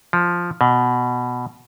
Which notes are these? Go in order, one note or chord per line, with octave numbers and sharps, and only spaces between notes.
F3
B2